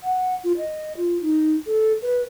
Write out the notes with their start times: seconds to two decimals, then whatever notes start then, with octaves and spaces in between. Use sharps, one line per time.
0.03 F#5
0.44 F4
0.58 D#5
0.97 F4
1.22 D#4
1.66 A4
2.02 B4